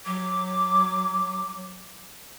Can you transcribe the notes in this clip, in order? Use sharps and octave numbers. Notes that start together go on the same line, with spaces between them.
F#3 D6